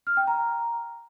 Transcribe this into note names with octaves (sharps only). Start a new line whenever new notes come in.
F6
G5
A#5